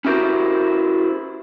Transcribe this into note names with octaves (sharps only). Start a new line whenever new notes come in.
C#4 E4 F#4 G4 A#4 C5